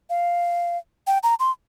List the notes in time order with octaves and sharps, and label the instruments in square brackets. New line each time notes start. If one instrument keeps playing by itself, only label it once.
[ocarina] F5
G5
A#5
C6